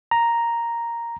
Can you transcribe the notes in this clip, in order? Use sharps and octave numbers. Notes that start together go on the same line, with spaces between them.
A#5